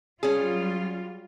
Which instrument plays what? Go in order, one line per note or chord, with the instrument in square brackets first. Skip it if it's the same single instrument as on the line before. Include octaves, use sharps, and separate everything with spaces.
[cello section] F#3 G3 F4 [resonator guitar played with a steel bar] C#4 G#4